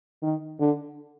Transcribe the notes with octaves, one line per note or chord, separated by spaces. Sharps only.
D#3
D3